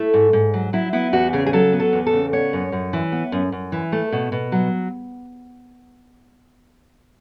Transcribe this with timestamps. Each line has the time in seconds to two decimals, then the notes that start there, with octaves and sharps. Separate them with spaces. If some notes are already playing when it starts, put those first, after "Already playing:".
Already playing: A3 E4
0.14 G#2
0.33 G#2
0.54 F#3
0.73 F#3 E4
0.93 B3 E4
1.13 E2 F#4
1.33 C#3 G#4
1.46 G#4
1.53 F#3 A4
1.73 B3
1.80 A4
1.93 E2
2.06 A4
2.13 C#3
2.33 B3 C#5
2.53 F#2
2.72 F#2
2.93 E3
3.12 B3
3.32 F#2
3.52 F#2
3.72 E3
3.92 A3
4.12 B2
4.32 B2
4.52 F#3